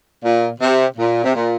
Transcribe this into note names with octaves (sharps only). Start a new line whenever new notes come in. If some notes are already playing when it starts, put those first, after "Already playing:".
A#2
C3
A#2
C3
A#2